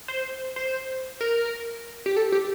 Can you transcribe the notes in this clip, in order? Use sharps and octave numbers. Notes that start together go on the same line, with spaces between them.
C5
C5
A#4
G4
A4
G4